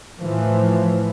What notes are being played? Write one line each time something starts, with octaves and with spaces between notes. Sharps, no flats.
A2 E3 F3